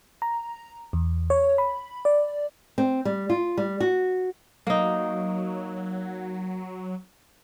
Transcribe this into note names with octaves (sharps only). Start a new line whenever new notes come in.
A#5
E2
C#5
B5
D5
C4
G3
F4
G3
F#4
F#3 A#3 D#4